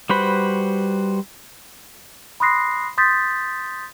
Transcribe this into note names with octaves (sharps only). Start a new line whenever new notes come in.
G3 F#4 B4 C5 B5
B5 C6 D#6 F#6 A#6 C7
C6 D#6 G6 A6 B6